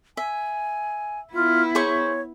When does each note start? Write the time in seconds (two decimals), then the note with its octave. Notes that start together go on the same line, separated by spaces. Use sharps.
0.17 E5 G#5
1.34 B3 E4 F4
1.75 G#4 C5 C#5 C#6